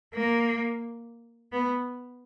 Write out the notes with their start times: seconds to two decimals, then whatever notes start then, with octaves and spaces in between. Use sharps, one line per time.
0.14 A#3
1.52 B3